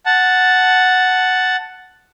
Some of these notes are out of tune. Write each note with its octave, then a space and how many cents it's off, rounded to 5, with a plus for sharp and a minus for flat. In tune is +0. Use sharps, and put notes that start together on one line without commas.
F#5 +0 A5 +0